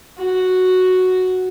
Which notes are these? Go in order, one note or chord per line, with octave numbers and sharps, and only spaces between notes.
F#4